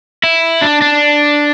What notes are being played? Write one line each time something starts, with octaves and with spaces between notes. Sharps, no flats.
E4
D4
D4